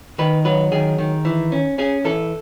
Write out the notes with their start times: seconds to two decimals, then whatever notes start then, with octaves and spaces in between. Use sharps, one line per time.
0.18 D#3 B4
0.45 F#3 B4
0.72 D#3 G#4
0.98 D#3
1.25 E3
1.52 C#4
1.78 C#4 G#4
2.05 E3 A4